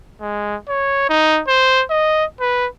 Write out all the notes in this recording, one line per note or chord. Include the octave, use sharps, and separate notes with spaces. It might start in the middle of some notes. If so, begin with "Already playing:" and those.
G#3
C#5
D#4
C5
D#5
B4